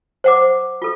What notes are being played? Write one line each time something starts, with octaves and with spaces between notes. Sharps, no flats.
C5 F#5 D6
F4 A4